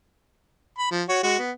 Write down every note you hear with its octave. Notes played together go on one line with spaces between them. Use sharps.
B5
F3
F#4 C#5
G#3 F#4
B3